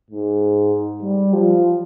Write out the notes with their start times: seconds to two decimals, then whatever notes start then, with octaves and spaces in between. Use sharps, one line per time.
0.10 G#2
1.02 G3
1.33 F3